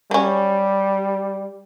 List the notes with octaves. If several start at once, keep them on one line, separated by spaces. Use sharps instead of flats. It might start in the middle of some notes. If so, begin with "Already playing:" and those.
F#3 G3 C#4